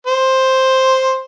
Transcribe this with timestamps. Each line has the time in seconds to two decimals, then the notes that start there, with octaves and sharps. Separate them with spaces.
0.07 C5